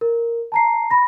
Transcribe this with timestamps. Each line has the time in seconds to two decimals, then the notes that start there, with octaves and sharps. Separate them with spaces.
0.01 A#4
0.52 A5 A#5 C7
0.90 B5 A#6